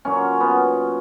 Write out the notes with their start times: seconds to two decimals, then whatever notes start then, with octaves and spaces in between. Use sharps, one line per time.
0.05 A#2 F#3 A#3 C#4
0.40 B3